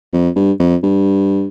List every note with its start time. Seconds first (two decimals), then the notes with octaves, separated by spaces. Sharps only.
0.13 F2
0.36 G2
0.60 F2
0.83 G2